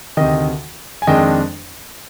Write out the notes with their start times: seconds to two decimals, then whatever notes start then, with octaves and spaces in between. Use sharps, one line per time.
0.17 D2 C3 D#3 D#5 G5
1.02 G#5
1.07 F2 D#3 G#3 D4 D#5 G5